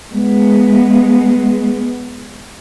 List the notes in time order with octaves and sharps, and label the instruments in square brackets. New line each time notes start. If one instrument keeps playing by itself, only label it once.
[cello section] G#3 B3